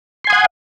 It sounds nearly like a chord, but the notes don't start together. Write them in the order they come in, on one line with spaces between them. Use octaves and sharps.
C6 G#5 D#6 F#5